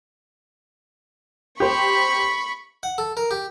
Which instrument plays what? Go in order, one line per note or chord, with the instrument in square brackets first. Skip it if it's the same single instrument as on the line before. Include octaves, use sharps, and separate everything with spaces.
[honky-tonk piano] G4 C5 [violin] B5 C#6
[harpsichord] F#5
A4
A#4
G4